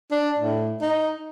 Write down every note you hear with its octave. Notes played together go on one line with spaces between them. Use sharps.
D4
A2
D#4